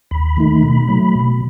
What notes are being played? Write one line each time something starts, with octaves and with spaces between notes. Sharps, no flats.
D#2 B5
D#3 A3 D#4
B2
F#3 A3
B2